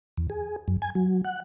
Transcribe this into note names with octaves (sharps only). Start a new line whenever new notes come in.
E2
G#4
F#2
G#5
F#3
F#5